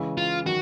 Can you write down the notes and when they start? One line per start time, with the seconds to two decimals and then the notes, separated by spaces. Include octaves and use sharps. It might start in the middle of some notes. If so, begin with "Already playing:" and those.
Already playing: C#3 E3 G#3
0.17 F4
0.46 D#3 F#3 F#4